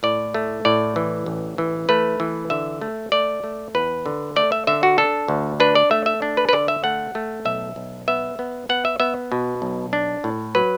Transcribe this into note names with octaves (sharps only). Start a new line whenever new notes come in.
A2 D5
A3
A2 D5
E3
A1
E3
A3 B4
E3
D3 E5
A3
A3 D5
A3
E2 B4
D3
A3 D5
E5
D3 E5
F#4
D4 A4
D2
D4 B4
D5
A3 E5
E5
D4
B4
B4
D3 D5
E5
A3 F#5
A3
B1 E5
B1
B3 E5
B3
B3 F#5
E5
B3 E5
B2
B1
D4
A2
F#3 B4